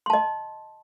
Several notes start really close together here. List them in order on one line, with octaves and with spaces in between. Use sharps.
C6 A5 D#5